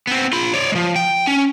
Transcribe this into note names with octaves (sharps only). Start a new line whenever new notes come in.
B3 C4
F4 B5
C#5 D5
F3 G#3
G5
C#4